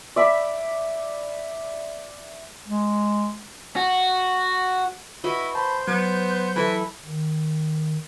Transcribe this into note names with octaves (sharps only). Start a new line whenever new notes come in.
D5 E5 B5
G#3
F#4
E4 F#4 B4 D#5
C5 A5 B5
F#3 B3
E3 E4 A4 B4
D#3